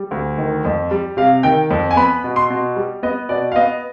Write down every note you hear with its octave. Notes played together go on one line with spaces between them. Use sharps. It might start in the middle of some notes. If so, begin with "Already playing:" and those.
Already playing: G3
D2
D#3
F2
G3
C3 F5
D#3 G5
F2
G#5
B3 B5
B2
C6
B2
G3
B3 D#5
B2 D5
F5
B3 D#5